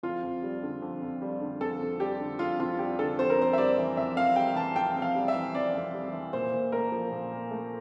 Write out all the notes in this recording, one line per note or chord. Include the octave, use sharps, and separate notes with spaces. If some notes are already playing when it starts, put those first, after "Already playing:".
F2 F4
F2
G3
D3
F2
F2
G3
D3
F2 A4
F2
G3 G4
D3
F2 F4
F2 F4
G3 G4
D3 A4
F2 C5
A#4
F2 C5
E5
G3 D5
E3
F2 E5
F2 F5
G3 G5
E3 A5
F2 G5
F2
F5
G3
E5
E3
F2 D5
F2
G3
E3
A#2 C5
A#2
A3 A#4
F3
A#2
A#2
A3